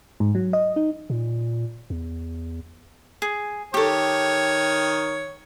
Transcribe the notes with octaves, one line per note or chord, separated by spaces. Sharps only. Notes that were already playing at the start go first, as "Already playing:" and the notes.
G#2
F#3
D#5
D#4
A#2
E2
G#4
D#3 G4 A4 C#5